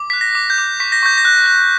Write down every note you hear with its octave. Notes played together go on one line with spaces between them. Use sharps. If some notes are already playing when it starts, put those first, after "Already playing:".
Already playing: D6
F#6 B6
A#6
D6
G6
D6
C#6 B6
A#6
C#6 G6
A#6
F#6
F#6